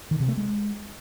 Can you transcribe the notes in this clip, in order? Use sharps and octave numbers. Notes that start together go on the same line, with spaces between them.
D#3
C3
A3
G#3